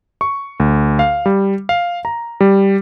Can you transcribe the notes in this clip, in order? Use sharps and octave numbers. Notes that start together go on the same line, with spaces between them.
C#6
D2
F5
G3
F5
A#5
G3